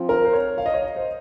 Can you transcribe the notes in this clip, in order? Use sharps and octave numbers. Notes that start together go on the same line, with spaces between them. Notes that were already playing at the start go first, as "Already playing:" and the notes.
Already playing: F3 C4 F4
A#4
C5
C#5
F5
D#5
C#5
D#5
C5